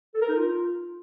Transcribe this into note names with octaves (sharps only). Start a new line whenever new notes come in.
A4
A#4
D#4
F4